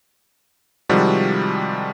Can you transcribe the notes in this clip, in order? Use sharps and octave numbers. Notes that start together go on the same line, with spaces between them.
C3 D#3 F3 G3 G#3 F#4